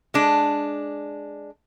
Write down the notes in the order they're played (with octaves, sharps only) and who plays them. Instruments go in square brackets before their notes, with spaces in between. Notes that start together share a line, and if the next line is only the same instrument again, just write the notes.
[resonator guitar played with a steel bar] G#3 D4